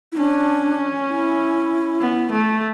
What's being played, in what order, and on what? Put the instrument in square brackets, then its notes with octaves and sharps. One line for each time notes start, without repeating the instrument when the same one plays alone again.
[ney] E4
[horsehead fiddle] C#4 [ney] D4
[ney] E4
[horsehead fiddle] B3
A3